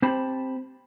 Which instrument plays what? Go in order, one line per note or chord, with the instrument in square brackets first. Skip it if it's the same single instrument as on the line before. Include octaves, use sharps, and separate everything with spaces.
[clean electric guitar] C4 G4 C5 A5 B5